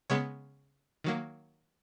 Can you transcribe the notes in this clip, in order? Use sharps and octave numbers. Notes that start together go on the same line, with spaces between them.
C#3 G#3 B3 C#5
D#3 F#3 A#3